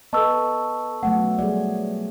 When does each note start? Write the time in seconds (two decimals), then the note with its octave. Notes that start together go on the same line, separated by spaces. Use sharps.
0.13 B3 A4 B4 D#5 A5 C#6 E6
1.03 F#3 A3 B3 F#5
1.39 F#3 G3 G#4 D5